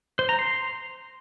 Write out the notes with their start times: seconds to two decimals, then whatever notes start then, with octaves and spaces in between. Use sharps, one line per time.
0.19 C5
0.29 A#5
0.39 C6